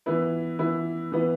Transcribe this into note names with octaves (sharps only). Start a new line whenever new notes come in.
E3 B3 E4 B4
E3 B3 E4 B4
E3 B3 E4 B4